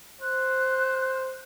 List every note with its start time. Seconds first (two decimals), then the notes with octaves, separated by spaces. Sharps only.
0.21 C5 F#6